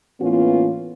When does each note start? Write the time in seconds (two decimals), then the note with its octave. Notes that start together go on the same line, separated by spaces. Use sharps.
0.21 A2 E3 A#3 B3 C#4 F4